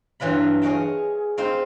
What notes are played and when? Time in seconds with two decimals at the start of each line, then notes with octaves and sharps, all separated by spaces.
0.20 G2 E3 F#3 F4 B5
0.62 G#4 C#5 D#5 F5 G5 A5
1.38 C4 D#4 F4 C5